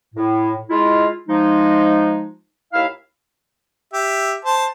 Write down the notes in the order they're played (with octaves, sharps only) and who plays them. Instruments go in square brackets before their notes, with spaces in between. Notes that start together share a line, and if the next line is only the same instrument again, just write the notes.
[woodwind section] A2
G#3 E4 F4
F3 G#3 D#4
D#2 E4 E5 F5
[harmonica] G4 E5
C5 A5